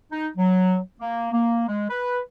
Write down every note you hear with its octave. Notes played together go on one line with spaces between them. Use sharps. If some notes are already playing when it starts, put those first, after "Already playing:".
D#4
F#3
A#3
A#3
G#3
B4